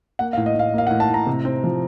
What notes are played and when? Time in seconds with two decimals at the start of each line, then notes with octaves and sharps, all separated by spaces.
0.19 A#3 F#5
0.33 F5
0.37 A2
0.46 D#5
0.55 A2 F5
0.74 A#3 F5
0.87 F#5
0.91 A2
1.00 A5
1.09 A2 A#5
1.27 C3
1.45 C4
1.64 F3